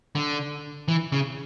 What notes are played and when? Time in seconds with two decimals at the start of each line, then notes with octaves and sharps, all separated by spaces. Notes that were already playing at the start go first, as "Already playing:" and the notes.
0.15 D3
0.88 E3
1.12 C#3